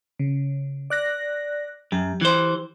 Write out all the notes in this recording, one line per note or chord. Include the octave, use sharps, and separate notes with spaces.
C#3
D5 F#6 A#6
F#2 G4
E3 C5